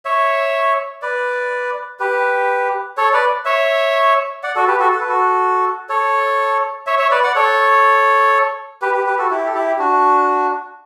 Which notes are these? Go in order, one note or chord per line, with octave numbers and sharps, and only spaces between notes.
C#5 E5
B4 D5
G4 B4
A4 C#5
B4 D5
C#5 E5
D5 F#5
F#4 A4
G4 B4
F#4 A4
A4
B4
F#4 A4
A4 C#5
C#5 E5
C#5 E5
B4 D5
D5 F#5
A4 C#5
G4 B4
G4 B4
G4 B4
F#4 A4
E4 G4
A4
E4 G4
D4 F#4